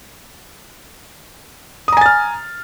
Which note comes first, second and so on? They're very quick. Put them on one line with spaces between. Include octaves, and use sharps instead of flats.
D#6 A#5 G#5 A6 F6